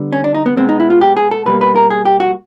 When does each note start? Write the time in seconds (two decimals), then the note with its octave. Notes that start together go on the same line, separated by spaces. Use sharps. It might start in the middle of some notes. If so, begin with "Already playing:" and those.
Already playing: D3 G3 B3
0.13 C#4
0.24 D4
0.34 D#4
0.46 B3
0.57 B2 G#3 B3 C4
0.69 D#4
0.80 E4
0.90 F4
1.01 G4
1.17 G#4
1.31 A4
1.46 B2 G3 A#3 B4
1.61 B4
1.76 A#4
1.90 G#4
2.05 G4
2.20 F#4